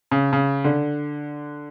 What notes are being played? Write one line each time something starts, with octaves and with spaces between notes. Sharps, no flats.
C#3
C#3
D3